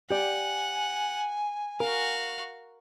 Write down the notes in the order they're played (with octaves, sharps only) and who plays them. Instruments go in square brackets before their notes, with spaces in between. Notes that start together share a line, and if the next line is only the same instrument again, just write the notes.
[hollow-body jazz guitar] G4 D5 [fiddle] F#5 [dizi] G#5
[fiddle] F#4 F5 [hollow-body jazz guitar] A#4